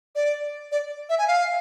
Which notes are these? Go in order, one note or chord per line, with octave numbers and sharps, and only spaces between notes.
D5
D5
E5
G#5
F5